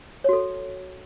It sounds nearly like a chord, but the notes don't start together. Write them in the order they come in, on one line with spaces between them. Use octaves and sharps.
C#5 F#4 A4